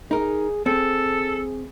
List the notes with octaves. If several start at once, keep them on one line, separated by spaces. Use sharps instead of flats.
D#4 G#4 A#4
C4 G#4 A4